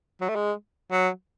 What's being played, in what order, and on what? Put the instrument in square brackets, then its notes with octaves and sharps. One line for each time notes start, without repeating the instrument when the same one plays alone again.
[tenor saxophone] F#3
A3
G#3
F#3